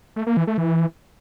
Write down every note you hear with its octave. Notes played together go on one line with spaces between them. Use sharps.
A3
A#3
E3
A3
E3